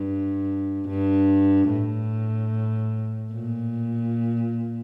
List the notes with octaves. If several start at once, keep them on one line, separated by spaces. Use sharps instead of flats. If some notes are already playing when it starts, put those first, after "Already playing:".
Already playing: G2
G2
A2
A#2